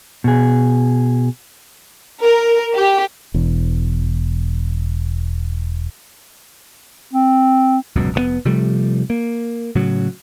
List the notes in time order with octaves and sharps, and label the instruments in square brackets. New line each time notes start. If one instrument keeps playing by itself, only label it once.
[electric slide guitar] B2 G#4
[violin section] A#4
G4
[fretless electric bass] E1 E2
[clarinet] C4
[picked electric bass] D1 C#2 F#2 B2
F1 A#2 B3
C3 F3 G3 A3
A#3
A2 C#3 F#3